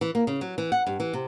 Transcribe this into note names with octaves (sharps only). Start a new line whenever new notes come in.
E3
A#3
C#3
F#3
E3
F#5
G2
E3
C3